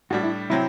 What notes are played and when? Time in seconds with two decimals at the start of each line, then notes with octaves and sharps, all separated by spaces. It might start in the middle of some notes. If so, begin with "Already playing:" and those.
0.10 A2 G3 D4 F#4
0.24 E4
0.50 C3 F#3 C4 E4